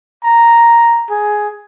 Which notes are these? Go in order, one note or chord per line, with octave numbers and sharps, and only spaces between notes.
A#5
G#4